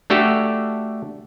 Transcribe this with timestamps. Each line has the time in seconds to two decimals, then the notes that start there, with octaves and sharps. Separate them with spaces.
0.10 A3 D4 F#4 G4 A4